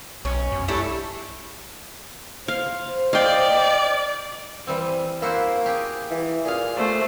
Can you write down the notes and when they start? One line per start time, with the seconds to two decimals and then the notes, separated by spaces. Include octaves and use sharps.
0.25 B1 C#4
0.52 F#2
0.68 G3 A3 D4 E4
2.48 C5 F5
3.13 D5 D#5 F5 G5
4.67 E3 G3 C4
5.22 A#3 E4 F#4 C5
5.66 G4 G#4
6.11 E3
6.45 A#2 G#4 F5
6.76 A3 C5 D5